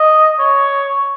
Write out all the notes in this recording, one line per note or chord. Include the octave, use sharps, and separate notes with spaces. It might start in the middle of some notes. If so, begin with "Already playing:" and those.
Already playing: D#5
C#5